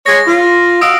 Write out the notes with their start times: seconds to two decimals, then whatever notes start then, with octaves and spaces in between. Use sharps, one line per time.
0.06 G#3 G#4 C#5 A#6
0.27 F4
0.81 F#4 D#5 F5 D#6 E6 D7